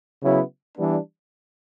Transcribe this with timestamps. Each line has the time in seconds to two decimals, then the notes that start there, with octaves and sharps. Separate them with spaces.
0.20 C#3 F#3 B3 E4
0.77 E3 G3 B3 D4